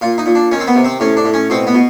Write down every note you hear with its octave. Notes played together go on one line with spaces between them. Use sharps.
A#2 F4
D#4
A#2
D4
D#3 C#4
C4
B3
C3
C4
A2 C#4
D4
A2
C#4
B2 C4
B3
B2